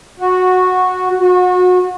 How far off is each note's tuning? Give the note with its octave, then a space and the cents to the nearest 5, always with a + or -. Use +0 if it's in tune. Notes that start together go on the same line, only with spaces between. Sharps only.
F#4 -10
F#4 -30